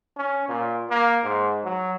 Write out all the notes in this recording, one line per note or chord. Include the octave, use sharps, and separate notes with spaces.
C#4
A#2
A#3
G#2
F#3